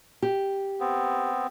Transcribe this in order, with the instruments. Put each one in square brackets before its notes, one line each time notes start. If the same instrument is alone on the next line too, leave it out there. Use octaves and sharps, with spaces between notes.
[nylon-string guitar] G4
[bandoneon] B3 C4